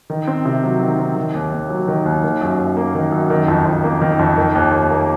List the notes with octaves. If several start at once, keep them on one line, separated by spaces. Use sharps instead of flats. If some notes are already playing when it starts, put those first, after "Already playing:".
D#3
C4
C3
F#3
D#3
C4
D#3
D#2
D#2
F#3
D#3
D#2
D#3
F#2
F#2
A#3
D#3
F#2
D#3
F2
F2
A#3
D#3
F2
D#3
D#2
D#2
A#3